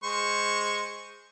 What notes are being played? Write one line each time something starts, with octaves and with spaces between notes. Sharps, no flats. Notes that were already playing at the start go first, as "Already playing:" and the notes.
G#3 C5 C#6